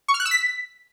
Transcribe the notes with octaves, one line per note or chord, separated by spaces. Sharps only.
C#6
F6
F#6
E6
B6